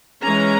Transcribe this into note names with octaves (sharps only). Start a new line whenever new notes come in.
E3 G#3 C#4 A#5